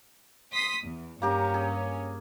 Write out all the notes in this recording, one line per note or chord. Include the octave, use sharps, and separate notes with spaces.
C6 D#6 B6
E2
G2 A#3 C#4 G4 A#5
G#4